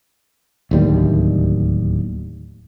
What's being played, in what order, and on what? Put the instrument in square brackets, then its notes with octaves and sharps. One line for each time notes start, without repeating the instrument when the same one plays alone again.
[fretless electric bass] D1 D#2 G3